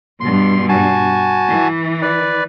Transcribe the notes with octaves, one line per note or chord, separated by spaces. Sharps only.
G2 B2 C6
F#4 G#5 A5
E3
B4 D5